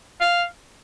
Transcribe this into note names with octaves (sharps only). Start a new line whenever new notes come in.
F5